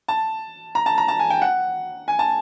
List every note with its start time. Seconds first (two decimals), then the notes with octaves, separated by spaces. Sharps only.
0.08 A5
0.75 A#5
0.86 A5
0.98 A#5
1.08 A5
1.19 G#5
1.30 G5
1.42 F#5
2.08 G#5
2.19 A5